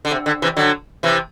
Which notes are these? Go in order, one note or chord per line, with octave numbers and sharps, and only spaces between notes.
D3
C3
D3
C3 E3
D3 F#3
C3 E3